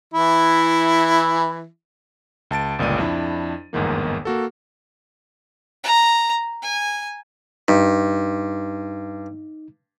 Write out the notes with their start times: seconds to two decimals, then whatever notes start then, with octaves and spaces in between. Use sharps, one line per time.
0.14 E3 E4
2.51 C#2 A5 A6 D7
2.79 G1 C#2 A#2 D5 D#7
2.98 F2 D4 E4
3.73 G1 E2 G#2 D#3 A#3
4.25 A#3 F#4 A4
5.84 A#5
6.63 G#5
7.68 G2 D#4